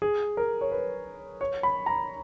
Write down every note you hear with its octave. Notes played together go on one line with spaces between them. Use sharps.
G#4
A#4
C#5
B4
C#5
B5
A#5